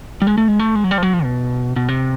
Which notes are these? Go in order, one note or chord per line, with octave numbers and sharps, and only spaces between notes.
G3
G#3
A3
G#3
A3
G#3
F#3
G3
F3
F#3
F3
B2
B2
C3